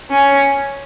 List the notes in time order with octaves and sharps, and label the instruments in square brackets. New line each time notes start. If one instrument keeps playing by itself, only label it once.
[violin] C#4